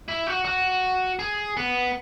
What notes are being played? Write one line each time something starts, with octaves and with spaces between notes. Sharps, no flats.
E4
F#4
F#4
G#4
B3